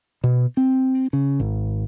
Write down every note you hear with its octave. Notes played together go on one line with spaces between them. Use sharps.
B2
C4
C#3
G#1